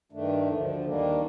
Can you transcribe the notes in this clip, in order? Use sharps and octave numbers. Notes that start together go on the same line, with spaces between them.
G2 D#3 A3 D4
D2 D3 F3
D#2 D#3 G3 A#3 D4